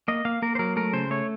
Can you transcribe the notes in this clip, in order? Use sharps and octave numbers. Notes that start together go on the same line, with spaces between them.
A#3 D#5
A#3 F5
A#3 A#4
C5
F#3 A#4
A3 A#4
C#3 C5
A3 C#5